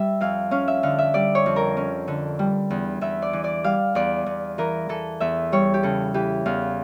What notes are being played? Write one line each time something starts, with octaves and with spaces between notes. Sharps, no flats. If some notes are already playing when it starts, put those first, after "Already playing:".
Already playing: G3 E5
F2 F5
C#4 F5
E5
D3 F5
E5
G3 D5
C#5
F2
A#4
C#4
D3
G3
E2
E2 E5
D5
E3
D5
G3 F5
E2 D5
E2
E3 A#4
E3 A4
E2 E5
G3 C#5
G4
C#3 A4
E3 G4
E2 F5